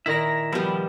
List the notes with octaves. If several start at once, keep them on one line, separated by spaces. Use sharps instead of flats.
A#2 D#3 E4 E5 A#5 A#6
F3 G3 B3 E4 G4